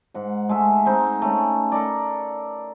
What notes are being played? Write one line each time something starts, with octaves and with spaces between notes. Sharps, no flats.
G#2 F#5
G#3 A3 E5
G#3 C4 D#4
A3 C#4
A4 A#4 D5